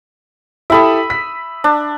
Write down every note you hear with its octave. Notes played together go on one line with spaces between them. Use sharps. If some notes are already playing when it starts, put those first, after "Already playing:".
E4 G4 A4 E5 B5 D#6
B6
D4